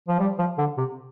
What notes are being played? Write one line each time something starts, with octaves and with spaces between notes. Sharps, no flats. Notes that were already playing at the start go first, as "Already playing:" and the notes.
F3
G3
F3
D3
C3